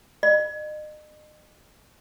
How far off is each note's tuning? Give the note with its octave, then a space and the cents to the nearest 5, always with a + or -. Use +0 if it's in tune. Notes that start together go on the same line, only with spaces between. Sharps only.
D#5 -40